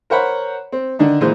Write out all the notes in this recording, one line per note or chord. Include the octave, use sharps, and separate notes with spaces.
A#4 C5 C#5 F#5 B5
C4
D3 D#3 D4 D#4
A#2 E3 G#3 C5